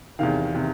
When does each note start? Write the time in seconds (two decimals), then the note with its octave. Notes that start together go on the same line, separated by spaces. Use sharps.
0.19 E2 C3 D#3 F5
0.55 C3 D#3